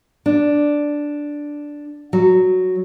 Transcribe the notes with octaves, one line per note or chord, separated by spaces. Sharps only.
D4
F#3